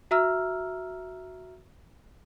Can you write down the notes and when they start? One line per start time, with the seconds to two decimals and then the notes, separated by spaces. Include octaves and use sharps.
0.11 F#4 E5 A#5 E6 F6